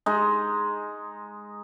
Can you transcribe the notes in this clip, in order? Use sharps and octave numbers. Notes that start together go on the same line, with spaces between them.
G#3 D#4